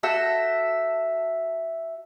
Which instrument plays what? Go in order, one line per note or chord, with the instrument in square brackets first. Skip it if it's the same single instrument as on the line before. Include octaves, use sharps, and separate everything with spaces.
[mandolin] F#4 A4 E5 G5